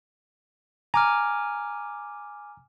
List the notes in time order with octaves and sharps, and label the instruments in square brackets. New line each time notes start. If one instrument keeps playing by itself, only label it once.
[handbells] G#5 D6 F6 [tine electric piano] A#5